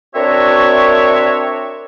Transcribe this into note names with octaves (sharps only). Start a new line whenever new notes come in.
C4 D4 F#4 A#4 C#5 E5